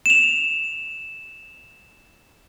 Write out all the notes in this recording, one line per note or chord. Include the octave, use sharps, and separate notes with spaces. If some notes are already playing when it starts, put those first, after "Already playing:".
E7 F7